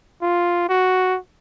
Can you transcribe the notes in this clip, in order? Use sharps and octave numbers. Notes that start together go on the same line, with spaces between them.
F4
F#4